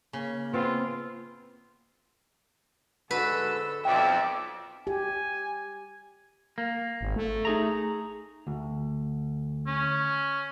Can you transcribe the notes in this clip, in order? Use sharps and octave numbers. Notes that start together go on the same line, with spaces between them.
C#3 A#3
B3 C4 F4
G#2 D3 F#4 A4 B4 E6
B1 F2 D5 E5 G5
G4 G#5
A#3
G#1
A3
D#4 G#4 A#5
D2
C#4